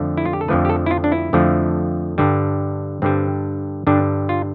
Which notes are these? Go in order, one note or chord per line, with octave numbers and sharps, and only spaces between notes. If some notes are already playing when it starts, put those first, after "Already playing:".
Already playing: F2 D3 F3 A3
E4
F4
G4
A4
F2 D3 F3 A3 B4
G4
A4
E4
F4
D4
E4
F2 D3 F3 A3
G2 D3 G3
G2 D3 G3 C4
G2 D3 G3 D4
F4